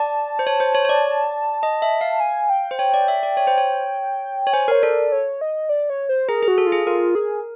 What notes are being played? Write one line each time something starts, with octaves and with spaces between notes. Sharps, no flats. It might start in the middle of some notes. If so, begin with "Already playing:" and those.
Already playing: D5 A5
C5
C#5
C5
C#5
C#5
D5
D#5
E5
F5
G#5
G5
C5
C#5 G5
D5
E5
D5
C#5
C5
C#5
C#5
C5 G#5
A#4 C#5
A4 D5
C#5
D#5
D5
C#5
C5
G#4 A#4
G#4
F#4
A4
F4
G#4
F4 A#4
G#4